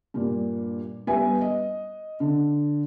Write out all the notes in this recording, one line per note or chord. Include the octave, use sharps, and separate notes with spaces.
G2 A#2
G1 G2 G4 B4 E5 G#5
D#5
D3